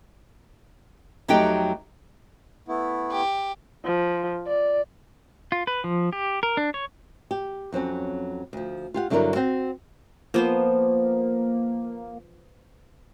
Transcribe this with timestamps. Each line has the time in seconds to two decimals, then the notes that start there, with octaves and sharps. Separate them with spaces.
1.28 F2 F#3 A3 D#4 G4 G5
2.68 A3 B3 E4
3.11 G4
3.85 F3
4.47 D5
5.52 F4
5.67 B4
5.84 F3
6.13 G4
6.43 A#4
6.57 D4
6.74 C#5
7.31 G4
7.72 F2 F#3 C4 C#4
8.53 D2 F3
8.94 F4 G4 F#5
9.10 G2 D3 F#3 E4 A#4 D5
9.35 C4 F#4 G5
10.34 F3 A#3 B3 C5